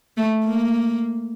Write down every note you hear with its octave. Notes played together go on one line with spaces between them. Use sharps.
A3
A#3